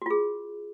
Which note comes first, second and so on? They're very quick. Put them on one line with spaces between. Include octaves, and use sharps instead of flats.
F#4 F4 G#4